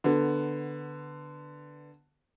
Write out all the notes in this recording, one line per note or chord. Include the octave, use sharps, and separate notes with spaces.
D3 B3